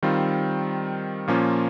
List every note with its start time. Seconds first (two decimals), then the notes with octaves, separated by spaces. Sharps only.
0.03 D#3 G3 C4 F4
1.28 A#2 F3 A#3 C#4 F4